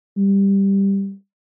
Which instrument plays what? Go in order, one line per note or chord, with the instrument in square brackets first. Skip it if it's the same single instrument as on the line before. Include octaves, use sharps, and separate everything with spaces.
[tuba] G3